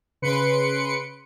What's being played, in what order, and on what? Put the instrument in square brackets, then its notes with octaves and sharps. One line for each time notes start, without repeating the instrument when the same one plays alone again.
[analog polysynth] C#3 B4 C6 C#7 D7